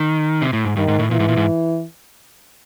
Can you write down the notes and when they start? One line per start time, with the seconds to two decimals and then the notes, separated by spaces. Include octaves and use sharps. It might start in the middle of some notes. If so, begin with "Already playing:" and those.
Already playing: D#3
0.42 C3
0.53 A2
0.65 G#2
0.77 G2 D#3
0.88 G#2
0.99 A2
1.11 A#2 E3
1.20 G#2
1.29 A#2
1.37 G#2